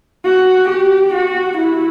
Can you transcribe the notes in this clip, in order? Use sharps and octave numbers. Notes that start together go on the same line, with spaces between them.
F#4
G4
F#4
E4